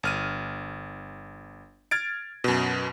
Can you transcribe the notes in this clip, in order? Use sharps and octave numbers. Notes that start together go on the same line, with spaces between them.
G1 F6 D#7
F6 G#6 A6 D7
F#2 B2